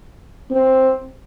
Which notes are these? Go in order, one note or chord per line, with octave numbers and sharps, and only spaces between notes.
C4